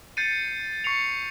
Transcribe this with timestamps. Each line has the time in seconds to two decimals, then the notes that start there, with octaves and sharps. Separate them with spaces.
0.17 G6 A6 C7 C#7 D#7
0.84 C#6 C7 C#7 F7